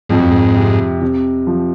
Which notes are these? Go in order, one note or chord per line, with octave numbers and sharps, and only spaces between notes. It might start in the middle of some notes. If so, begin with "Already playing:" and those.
F2 G#2
F#2
G#2
C3
C3
F3